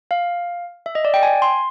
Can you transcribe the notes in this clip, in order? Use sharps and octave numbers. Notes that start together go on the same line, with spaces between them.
F5
E5
D#5
D5
G5
G#5
C6